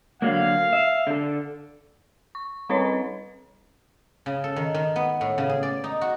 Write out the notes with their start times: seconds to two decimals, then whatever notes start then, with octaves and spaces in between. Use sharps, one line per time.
0.22 D3 F#3 A#3 F5
0.73 E5
1.07 D3 A4
2.35 C#6
2.69 G3 C4 C#4 B4 C#5 D#5
4.26 C#3
4.44 A4
4.56 D#3
4.74 D#3
4.96 B3
5.21 A2
5.38 C#3
5.49 G#4
5.63 D5
5.84 D#4
6.01 F#4